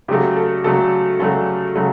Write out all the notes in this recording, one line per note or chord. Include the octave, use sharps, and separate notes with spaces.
C#3 F#3 A3 G4
A4
C#3 F#3 A3 A4
C#3 F#3 A3 A4
C#3 F#3 A3